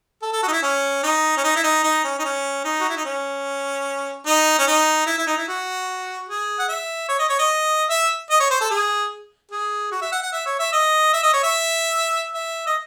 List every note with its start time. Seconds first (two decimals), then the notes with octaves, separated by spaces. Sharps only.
0.22 A4
0.32 A4
0.43 F#4
0.48 D#4
0.52 E4
0.63 C#4
1.03 D#4
1.37 C#4
1.44 D#4
1.56 E4
1.64 D#4
1.83 D#4
2.04 C#4
2.19 D#4
2.24 C#4
2.65 D#4
2.80 F#4
2.89 E4
2.97 D#4
3.05 C#4
4.26 D#4
4.59 C#4
4.67 D#4
5.06 E4
5.18 E4
5.27 D#4
5.37 E4
5.48 F#4
6.28 G#4
6.59 F#5
6.69 E5
7.09 C#5
7.19 D#5
7.29 C#5
7.39 D#5
7.90 E5
8.30 D#5
8.40 C#5
8.50 C5
8.61 A4
8.70 G#4
9.51 G#4
9.91 F#4
10.02 E5
10.12 F#5
10.22 F#5
10.32 E5
10.46 C#5
10.59 E5
10.73 D#5
11.13 E5
11.23 D#5
11.33 C#5
11.43 E5
12.34 E5
12.66 D#5